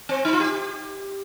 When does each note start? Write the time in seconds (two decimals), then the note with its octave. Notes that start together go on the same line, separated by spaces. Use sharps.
0.09 C4
0.25 D#4
0.33 F4
0.40 G4